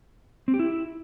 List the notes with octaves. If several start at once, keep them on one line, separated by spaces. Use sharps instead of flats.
C4
G4
E4